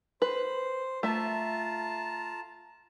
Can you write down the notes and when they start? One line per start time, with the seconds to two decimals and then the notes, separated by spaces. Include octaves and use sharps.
0.22 B4 C5
1.03 A3 F4 E5 A5 A#5